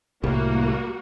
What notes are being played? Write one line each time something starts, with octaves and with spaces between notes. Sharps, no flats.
C2 A2 G3 A#3 F#4